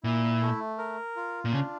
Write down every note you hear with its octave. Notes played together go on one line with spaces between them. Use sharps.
A#2 E4
A3
A#4
F4
A#2
C#3 D4